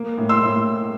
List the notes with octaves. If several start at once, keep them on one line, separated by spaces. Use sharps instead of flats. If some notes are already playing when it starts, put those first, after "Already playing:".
Already playing: A#3
A2
C6 E6
A2